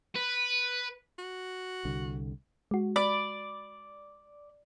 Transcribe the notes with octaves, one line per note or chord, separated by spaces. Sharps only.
B4
F#4
C2 D3
G#3 F#4
D5 B5